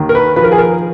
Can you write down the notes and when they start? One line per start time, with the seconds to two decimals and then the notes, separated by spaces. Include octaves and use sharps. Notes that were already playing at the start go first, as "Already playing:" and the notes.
Already playing: D#2 D#3
0.09 A#4
0.15 B4
0.36 F3 B4
0.44 A#4
0.52 G#4
0.58 A#4